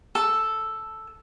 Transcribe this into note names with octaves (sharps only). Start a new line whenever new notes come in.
A4